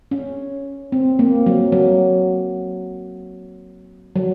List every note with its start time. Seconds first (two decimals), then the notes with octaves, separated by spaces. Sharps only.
0.11 C#4
0.92 C4
1.19 A#3
1.46 F#3
1.72 F#3
4.16 F#3